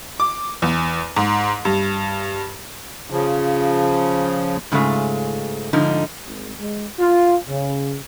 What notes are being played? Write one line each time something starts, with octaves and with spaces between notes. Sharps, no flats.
D6
E2
G#2
G2
C#3 F3
G#2 C#3 G#3 A3 F4
G#2 D3 F3 D#4
G#1
G#3
F4
C#3